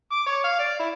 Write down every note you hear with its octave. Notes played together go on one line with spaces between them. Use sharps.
D6
C#5
F5
D5
E4